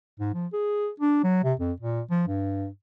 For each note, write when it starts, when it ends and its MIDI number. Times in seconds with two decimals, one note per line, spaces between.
0.20 0.32 44
0.34 0.47 53
0.53 0.89 68
1.00 1.20 62
1.24 1.42 54
1.44 1.54 48
1.60 1.72 41
1.80 2.01 46
2.10 2.24 53
2.28 2.67 43